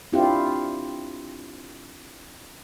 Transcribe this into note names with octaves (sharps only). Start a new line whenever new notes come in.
C4 D4 E4 F4 G4